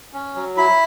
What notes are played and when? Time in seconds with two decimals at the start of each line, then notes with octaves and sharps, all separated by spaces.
0.13 C#4
0.35 F#3
0.57 E4 B5